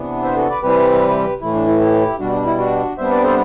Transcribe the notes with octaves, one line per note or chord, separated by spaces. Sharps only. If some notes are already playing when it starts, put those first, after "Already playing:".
Already playing: C3 E3 B3 D4
C5 E5
F#4 A4
B4 D5
C3 E3 G3 C4 G4 B4
A2 E3 A3 E4
D4
E4
E4 G4
B2 G3 D4 F#4
D4
E4
D4 F#4
C3 G3 B3 D4 C5 E5
B4 D5
A4 C5